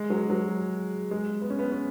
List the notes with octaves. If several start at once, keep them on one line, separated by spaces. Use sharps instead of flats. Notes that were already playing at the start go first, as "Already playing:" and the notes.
Already playing: G#3
F#3
F#3
G#3
B3
C#4
B3
C#4